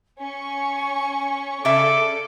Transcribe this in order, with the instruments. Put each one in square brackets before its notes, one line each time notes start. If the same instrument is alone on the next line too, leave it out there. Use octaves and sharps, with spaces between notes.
[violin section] C#4 C#6 [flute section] G#5
[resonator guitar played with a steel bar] C#3 E5 [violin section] A4 D5 [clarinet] D6